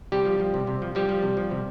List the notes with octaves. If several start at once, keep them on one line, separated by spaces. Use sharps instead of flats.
C3 G3 G4
F3
F3
C3
C3
F3
F3 G3 G4
F3
C3
F3
C3